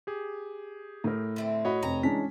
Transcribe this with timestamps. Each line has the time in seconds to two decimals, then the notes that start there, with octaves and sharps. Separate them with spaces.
0.07 G4 G#4
1.04 A2 A#4
1.36 D3 A3 C4
1.65 F#4 C#5 D#5 B5
1.83 F1 C3 C4 A#5
2.03 E3 G#3 C#4 D4 A5 B6